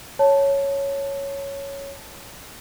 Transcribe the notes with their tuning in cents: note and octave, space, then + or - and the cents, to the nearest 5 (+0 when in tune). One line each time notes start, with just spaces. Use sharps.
C#5 +0 A5 +0